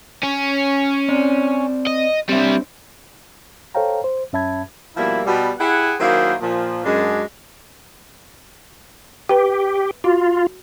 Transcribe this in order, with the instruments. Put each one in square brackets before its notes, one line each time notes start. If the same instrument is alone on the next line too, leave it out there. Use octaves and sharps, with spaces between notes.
[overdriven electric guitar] C#4
[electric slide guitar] C4 D5
[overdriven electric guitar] D#5
[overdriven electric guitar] G3 E4 [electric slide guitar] C4 D4
[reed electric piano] A4 C5 C#5 F5 G5 A#5
C5
F#2 C#4 E5 A5 B5 G#6
[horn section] B2 F3 G3 A#3 E4
B2 G3
E4 G4 G#4 F#5
D#3 F#3 A#3 E4 G#4 C5
A#2 F3
F#2 G#3 D4
[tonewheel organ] G4 [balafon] B4 G5
[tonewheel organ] F4 [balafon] F#4